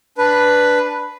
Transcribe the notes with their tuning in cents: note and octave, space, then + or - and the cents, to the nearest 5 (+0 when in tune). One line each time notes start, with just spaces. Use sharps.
D4 +0 B4 +0